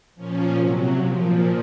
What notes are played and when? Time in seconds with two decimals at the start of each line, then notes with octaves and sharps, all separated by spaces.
0.15 A#2 F3 C#4
0.55 C3 F#3
0.94 A#2 F3